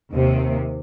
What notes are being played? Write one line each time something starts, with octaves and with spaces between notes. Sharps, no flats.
D#2 C3